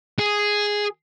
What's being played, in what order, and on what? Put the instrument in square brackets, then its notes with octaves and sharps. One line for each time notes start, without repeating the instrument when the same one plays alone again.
[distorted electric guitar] G#4